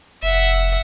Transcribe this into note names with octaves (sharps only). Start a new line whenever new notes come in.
F1 E5 F#5